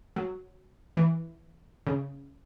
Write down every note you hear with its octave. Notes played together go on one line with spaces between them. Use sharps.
F#3
E3
C#3